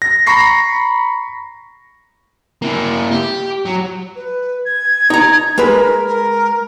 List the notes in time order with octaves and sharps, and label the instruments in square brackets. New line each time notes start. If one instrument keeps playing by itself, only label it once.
[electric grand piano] A#6
A#5 B5 C#6 A#6 C7
[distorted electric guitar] A#3 E4
G4
F#3
[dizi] B4
G#6
[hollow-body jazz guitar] D#4 A#5
[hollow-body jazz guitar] G#3 B4 [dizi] A#4
[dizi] A#4